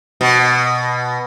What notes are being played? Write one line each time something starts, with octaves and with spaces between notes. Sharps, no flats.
B2